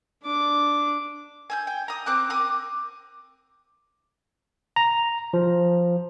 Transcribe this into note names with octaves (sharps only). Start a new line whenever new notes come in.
D4 D6
G#5 E6 G6
G5
A#5 D#6
C4 D6 F#6
A#4 D6 D#6
A#5
F3